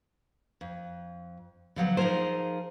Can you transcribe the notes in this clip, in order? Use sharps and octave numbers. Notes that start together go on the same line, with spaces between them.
F2
D3 F3 F#3 B3
F3 D#4 F4 G#4 A#4 C5